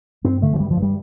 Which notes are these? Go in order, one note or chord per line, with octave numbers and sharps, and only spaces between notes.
G2 C4
D3 A3
F3
G2 G3
F3
G2
G3